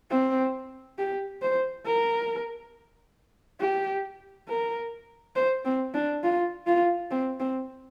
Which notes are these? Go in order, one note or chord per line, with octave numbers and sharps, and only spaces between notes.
C4
G4
C5
A#4
G4
A#4
C5
C4
D4
F4
F4
C4
C4